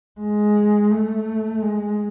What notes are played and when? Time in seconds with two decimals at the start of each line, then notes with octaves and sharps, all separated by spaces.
0.20 G#3
0.91 A3
1.63 G#3